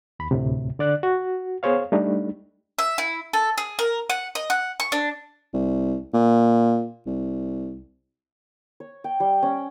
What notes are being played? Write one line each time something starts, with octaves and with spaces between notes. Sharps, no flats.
D#2 B5
D2 A2 C3
D3 D5 F#6
F#4
B3 G#4 C5 C#5 F5
G3 A3 D4 D#4
E5
E4
A4
G#4
A#4
F#5
D#5
F#5
C#6
D4
C2
A#2
C2
C#5
G5
G3
C#4